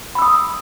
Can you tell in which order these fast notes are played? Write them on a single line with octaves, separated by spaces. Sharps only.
B5 E6 D#6